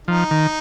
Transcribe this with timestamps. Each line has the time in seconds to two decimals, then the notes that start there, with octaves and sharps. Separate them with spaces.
0.08 F3 D#4
0.31 D#3